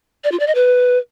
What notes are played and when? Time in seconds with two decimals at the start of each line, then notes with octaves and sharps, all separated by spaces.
0.24 D5
0.32 F4
0.40 D5
0.47 D#5
0.55 B4